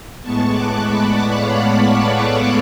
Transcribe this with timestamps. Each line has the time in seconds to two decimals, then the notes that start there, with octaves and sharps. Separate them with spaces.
0.23 A2 G#3 B3 A5 C#6
0.50 D6 F#6
0.79 B5 D6
1.07 D5 F#5
1.35 C#5 F5
1.91 B4 D5
2.19 A4 C#5